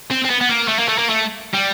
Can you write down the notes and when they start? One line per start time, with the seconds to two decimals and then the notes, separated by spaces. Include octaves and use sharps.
0.11 C4
0.25 C4
0.30 B3
0.41 B3
0.49 A#3
0.68 A3
0.79 A#3
0.88 A3
0.99 A#3
1.10 A3
1.54 G3